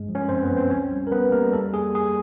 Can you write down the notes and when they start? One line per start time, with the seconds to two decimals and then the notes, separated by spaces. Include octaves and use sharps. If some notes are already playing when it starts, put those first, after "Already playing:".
Already playing: G2 G#3
0.09 F3
0.15 C#4 C#5
0.29 F#2 C4 C5
0.43 B3 B4
0.50 F3
0.56 C4 C5
0.70 C#2 C#4 C#5
0.91 G3
1.07 A#4
1.11 G3 B3 B4
1.32 G3 A#3 A#4
1.53 F2 A4
1.73 A#3 G#4
1.94 A#3 G#4